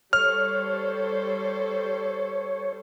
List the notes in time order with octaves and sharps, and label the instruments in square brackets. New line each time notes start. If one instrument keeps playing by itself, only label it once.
[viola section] G3 A4 C5 [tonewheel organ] C#5 [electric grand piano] F6